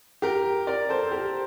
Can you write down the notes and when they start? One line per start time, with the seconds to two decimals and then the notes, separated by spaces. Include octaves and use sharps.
0.22 G4 A#4
0.67 A#4 D5
0.89 A4 C5
1.11 G4 A#4